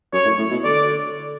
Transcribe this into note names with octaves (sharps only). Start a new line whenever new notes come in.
F#2 C#5
A2
A2
B2
D3 D5